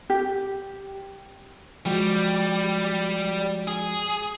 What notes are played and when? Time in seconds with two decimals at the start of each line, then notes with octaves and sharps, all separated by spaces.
0.10 G4
1.86 F3 G3 G#3 F#4 G4
3.68 G#4